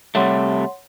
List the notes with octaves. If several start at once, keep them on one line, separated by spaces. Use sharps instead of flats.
C3 G3 A3 C#5 F#5 C6